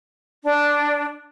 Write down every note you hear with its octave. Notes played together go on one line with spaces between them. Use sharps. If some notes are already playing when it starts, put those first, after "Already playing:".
D4